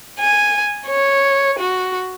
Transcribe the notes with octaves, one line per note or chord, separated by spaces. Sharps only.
G#5
C#5
F#4